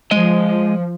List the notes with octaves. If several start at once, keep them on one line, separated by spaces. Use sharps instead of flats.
F3 G#3 D#5